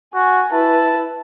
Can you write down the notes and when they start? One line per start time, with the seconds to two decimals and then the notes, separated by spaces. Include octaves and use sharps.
0.15 F#4 G#5
0.52 E4 B4 A5